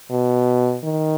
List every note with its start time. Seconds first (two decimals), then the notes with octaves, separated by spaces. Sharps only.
0.10 B2
0.83 D#3